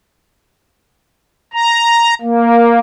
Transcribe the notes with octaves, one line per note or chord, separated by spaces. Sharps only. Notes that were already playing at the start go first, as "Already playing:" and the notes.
A#5
A#3